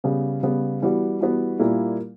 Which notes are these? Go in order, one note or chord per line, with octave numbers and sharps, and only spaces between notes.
C#3 G3 B3
C#3 G3 B3
E3 G3 B3 F#4
E3 G3 B3 F#4
A#2 G3 A#3 E4